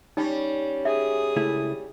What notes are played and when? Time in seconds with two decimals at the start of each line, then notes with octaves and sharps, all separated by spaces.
0.17 G3 C#4 D#4
0.85 G#4 E5 D#6
1.36 C#2 A3 E4